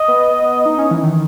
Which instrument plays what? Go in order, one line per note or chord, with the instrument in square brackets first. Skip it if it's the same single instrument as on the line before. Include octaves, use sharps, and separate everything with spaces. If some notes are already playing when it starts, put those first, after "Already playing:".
Already playing: [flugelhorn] D#5
[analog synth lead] B3
D#4
C#4
E3
D#3